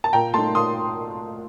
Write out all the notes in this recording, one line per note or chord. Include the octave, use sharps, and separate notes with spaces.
A5
A#2 G5 A#5
A3 D#4 A5 C6
A#2 C6 D#6